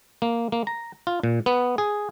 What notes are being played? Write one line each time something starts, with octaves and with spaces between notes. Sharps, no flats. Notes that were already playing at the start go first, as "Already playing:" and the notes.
A#3
A#3
A#5
F4
A#2
B3
G#4